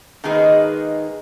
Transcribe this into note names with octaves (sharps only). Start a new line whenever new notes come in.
D#3 G#3 A#3 D#4 G#4 B4